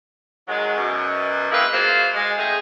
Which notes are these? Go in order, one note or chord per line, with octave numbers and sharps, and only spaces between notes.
D#3 F#3 G#3
F#2 B2
G#3 A#3 C4 E4 B4
F#3 A#3 F4 G#4 C5
G#3
G#3 A3 C4 D#4 G#4